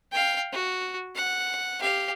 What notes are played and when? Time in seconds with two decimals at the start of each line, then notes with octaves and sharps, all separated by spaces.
0.12 F5 G5
0.53 F#4
1.15 F#5
1.80 G4 F5